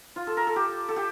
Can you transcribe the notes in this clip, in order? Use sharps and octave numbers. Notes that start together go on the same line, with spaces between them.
F4
A4
A#4
A4
G4
A4
G4